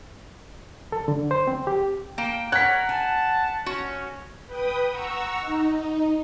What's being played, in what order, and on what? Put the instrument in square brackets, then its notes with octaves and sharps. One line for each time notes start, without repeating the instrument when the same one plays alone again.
[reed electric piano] A4
D3
C5
C4
G4
[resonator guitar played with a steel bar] A#3 [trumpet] G5
[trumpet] A#4 [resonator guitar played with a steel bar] C#5 [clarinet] F#5 [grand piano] F#6 B6
[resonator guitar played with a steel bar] G#5 [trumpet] A5
[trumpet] C#4 [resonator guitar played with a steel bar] F#4
[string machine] B4 G5 D#6
F#5 A#5 C#6 E6
D#4